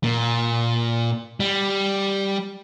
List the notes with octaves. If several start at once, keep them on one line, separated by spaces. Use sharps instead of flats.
A#2
G3